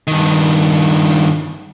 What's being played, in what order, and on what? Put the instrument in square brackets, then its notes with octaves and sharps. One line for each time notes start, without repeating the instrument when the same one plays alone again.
[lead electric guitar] G2 D#3